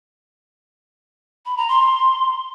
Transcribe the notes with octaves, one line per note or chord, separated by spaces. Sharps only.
B5
A#5
C6